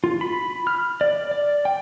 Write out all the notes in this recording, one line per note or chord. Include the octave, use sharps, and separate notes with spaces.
F4
B5
F6
D5
D5
G5